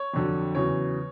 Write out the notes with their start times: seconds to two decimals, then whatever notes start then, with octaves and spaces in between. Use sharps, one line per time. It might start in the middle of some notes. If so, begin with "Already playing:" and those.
Already playing: C#5
0.14 F2 D3 F#3
0.55 E2 C#3 F#3 C#5